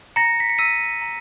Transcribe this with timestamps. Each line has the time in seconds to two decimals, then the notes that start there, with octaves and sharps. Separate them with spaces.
0.16 A#5 A#6 C#7
0.40 B6
0.50 C#7
0.58 E6 B6 D#7
1.02 A#5